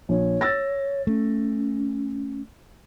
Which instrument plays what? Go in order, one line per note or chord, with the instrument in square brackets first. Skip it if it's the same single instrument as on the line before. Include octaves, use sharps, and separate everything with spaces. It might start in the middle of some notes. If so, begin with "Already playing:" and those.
[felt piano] A#1 [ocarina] C#5
[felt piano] E6 A6 A#6
[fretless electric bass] A3 [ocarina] C#4